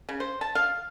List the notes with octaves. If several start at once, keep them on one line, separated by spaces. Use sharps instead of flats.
C#3
C5
A5
F5